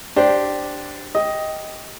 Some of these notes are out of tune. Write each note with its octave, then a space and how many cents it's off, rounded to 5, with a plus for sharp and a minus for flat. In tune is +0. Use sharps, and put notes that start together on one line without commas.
D4 +0 G4 -10 C5 +0
G4 +0 D#5 +10